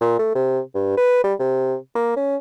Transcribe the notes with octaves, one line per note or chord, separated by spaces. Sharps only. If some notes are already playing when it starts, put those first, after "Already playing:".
A#2
A3
C3
G2
B4
G3
C3
A#3
C#4